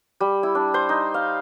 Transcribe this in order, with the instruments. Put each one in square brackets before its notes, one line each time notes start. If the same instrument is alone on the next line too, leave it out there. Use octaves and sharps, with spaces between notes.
[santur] G3
E4
D4
C5
D#4
F5